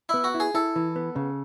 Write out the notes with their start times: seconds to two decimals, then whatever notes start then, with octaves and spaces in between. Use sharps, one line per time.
0.09 B3 E4
0.24 F#4
0.34 E4
0.40 G#4
0.54 E4 A4
0.76 E3
0.96 B3
1.16 C#3